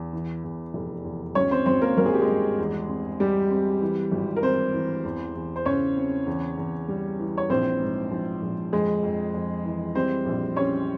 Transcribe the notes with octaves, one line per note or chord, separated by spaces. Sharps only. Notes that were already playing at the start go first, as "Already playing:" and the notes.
Already playing: E2
E3
E2
F1
E2
G#1 C#4 C#5
C4 C5
G#1 C4 C5
A#3 A#4
G#1 A#4
G#4
G4
G#3 G#4
G2
E2
C4
G3 G4
C4
E3
G#1
A#4
E3 C4 C5
E3
E2
E2
C5
C#3 C#4 C#5
C4
E2
E2
G3
E3
C#5
A#1 C4 C5
G#2
F3
A#1
F2 G#3 G#4
F2
F2
E3
G3 C4 C5
A#1
G3 C#4 C#5